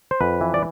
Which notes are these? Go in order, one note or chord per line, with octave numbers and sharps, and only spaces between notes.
C5
F2 B4
E3
D5